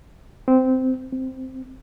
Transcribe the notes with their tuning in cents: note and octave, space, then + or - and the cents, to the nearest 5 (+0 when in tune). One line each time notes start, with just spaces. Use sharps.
C4 -15
C4 -5